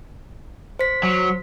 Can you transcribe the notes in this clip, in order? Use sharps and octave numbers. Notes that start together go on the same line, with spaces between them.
C5 B6
F#3